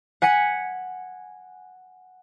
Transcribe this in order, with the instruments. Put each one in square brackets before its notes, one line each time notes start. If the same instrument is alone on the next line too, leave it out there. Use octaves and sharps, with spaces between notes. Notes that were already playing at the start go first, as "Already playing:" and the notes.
[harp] F#5 G#5 B6 C#7